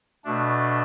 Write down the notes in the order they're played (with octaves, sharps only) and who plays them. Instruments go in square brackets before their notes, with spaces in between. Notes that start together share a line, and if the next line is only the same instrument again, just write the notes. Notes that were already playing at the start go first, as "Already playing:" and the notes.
[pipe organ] B2 A3 D4